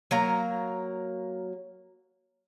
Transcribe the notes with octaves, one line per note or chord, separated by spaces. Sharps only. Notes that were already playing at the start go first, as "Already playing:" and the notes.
F#3 A#3 A#5